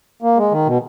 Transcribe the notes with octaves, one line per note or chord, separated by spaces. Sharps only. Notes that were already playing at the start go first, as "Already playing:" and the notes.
A#3
G#3
D#3
B2